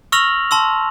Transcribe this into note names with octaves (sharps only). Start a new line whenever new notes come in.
C#6 E6 F6 A#6 F7 F#7
A5 C6 E6